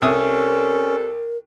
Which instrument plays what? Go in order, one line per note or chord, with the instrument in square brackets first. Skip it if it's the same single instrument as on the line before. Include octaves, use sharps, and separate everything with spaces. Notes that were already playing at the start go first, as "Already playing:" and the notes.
[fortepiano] C2 E5 D#6 [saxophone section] C3 G3 A4 [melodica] C#4 [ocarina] A#4